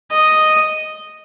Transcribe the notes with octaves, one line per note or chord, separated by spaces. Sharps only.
D#5